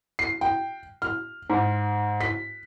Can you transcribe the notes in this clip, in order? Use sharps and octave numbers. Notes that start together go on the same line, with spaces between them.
C7
G5
F6
G#2
B6